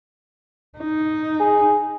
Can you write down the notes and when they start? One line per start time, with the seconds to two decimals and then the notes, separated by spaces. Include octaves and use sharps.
0.78 D#4
1.40 G#4